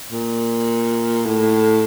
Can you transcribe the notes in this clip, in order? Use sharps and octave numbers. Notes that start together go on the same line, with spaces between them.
A#2
A2